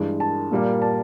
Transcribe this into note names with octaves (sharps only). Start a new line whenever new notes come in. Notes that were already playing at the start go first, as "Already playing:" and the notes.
Already playing: G2 E3 G#3
A5
A#2 G3 A#3
A5